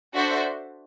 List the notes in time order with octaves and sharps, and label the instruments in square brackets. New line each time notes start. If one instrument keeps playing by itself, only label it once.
[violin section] D4 F#4 A4 C5 E5